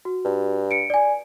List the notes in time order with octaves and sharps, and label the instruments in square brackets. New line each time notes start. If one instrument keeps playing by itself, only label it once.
[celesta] F#4
[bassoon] G2
[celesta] C#7 D7
D5 G#5